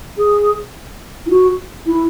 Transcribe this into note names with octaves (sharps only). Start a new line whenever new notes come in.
G#4
E4
F#4
E4